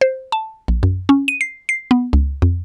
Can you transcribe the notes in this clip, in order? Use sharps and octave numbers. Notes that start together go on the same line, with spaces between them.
C5
A5
A#1
F#2
C#4
D#7
C7
C7
B3
C#2
F2